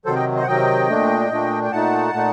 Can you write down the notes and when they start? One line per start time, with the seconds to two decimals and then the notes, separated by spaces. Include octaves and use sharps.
0.05 C3 D#3 F#3 A4 C5
0.15 D#5 G5
0.36 C5 D#5
0.43 F#5
0.47 C3 D#3 F#3 D#5 G5
0.89 A#2 A3 D4
1.30 A#2 A3 D4
1.63 G5
1.72 A#2 A3 D#4 F#5 A5
2.13 A#2 A3 D#4